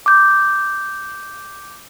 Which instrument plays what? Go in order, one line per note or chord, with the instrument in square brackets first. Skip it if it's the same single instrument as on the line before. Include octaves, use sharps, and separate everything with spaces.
[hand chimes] D6 G6